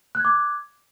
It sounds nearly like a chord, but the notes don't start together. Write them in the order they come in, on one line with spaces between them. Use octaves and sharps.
F#6 G#6 D6